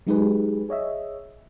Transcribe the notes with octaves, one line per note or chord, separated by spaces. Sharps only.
F#3 G#3 D#4 G4 G#4 B4
G#4 C#5 D#5 E5